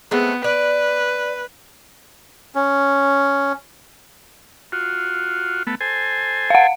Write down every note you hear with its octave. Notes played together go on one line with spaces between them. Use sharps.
G#3 A3 B3 C4
B4 D5
C#4
F4 F#4
A3 B3
A4 C5 G#5
F5 F#5